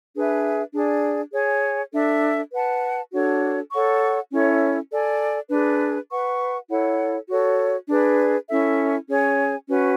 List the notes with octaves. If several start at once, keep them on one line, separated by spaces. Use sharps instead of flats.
D4 G#4 B4 E5
D4 G#4 D5
G#4 C#5 G#5
D4 A4 E5
B4 F#5 A5
D4 F#4 A4 C#5
A4 C#5 F#5 C#6
C#4 E4 A4 C#5
A4 D5 G#5
D4 G#4 B4
B4 F#5 C#6
E4 A4 C#5 F#5
F#4 A4 C#5
D4 G#4 B4 D5
C#4 E4 A4 E5
C#4 G#4 C#5 G#5
C#4 F#4 B4